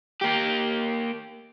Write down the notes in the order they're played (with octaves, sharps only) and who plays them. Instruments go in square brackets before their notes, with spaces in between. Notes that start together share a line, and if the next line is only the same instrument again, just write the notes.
[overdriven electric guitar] A#3 G4